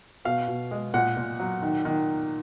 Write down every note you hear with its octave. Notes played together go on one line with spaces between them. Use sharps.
B2 F5
B2
G#3
A#2 F#5
A#2
F#3
D#3
D#3